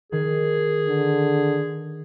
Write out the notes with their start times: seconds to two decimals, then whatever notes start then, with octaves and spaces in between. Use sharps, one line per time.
0.12 D#3 G#4
0.87 D3